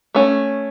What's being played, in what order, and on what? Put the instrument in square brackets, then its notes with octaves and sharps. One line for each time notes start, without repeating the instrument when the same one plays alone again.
[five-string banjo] A3 C#4